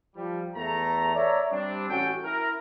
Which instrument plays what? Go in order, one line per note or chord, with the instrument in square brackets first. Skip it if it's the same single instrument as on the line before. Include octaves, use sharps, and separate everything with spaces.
[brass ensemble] F3 G3
E2 A3 A#5
C#5 D5 E5 A#5
G3 C4 D4
A1 C#4 F#4 A4 G5
E4 A#4